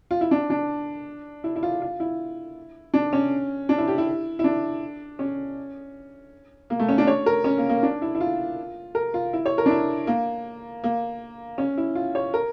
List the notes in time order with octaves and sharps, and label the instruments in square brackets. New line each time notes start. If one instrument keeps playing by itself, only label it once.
[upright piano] F4
E4
D4
D4
E4
E4
F4
F4
E4
D4
C#4
D4
E4
G4
E4
E4
D4
C#4
A#3
A3
C#4
D4
C#5
A#4
C#4
A#3
A#3
D4
E4
E4
F4
A#4
F4
E4
C#5
A#4
D4
E4
A#3
A#3
C#4
E4
F4
C#5
A#4